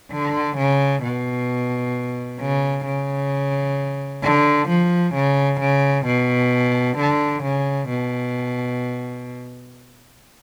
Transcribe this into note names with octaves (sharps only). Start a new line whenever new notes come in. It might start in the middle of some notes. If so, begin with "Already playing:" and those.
D3
C#3
B2
C#3
C#3
D3
F3
C#3
C#3
B2
D3
C#3
B2